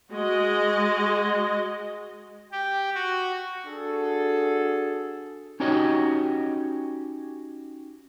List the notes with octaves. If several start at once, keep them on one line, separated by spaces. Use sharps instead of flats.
G#3 F#4 D#5
G4
F#4
D4 F#4 G#4 A4
C#4 D#4 F#4 G4 C#5 D#5